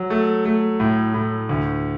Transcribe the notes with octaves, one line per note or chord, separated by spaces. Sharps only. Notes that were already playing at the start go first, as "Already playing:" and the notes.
Already playing: F#3
A3
A3
A2
A2
D2